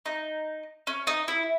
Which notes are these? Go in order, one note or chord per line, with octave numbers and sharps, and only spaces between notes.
D#4
C#4
D#4
E4